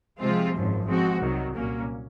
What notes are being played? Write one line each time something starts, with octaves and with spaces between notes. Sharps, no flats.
C3 F3 G#3 C4 F4
G#1 F#2 F3
F3 G#3 C4 F#4
C2 C3 D#3 F#3
C2 A#2 F#3 A#3 C#4